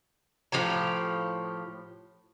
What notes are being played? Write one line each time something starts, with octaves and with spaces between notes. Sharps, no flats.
A2 F3 G4 A#5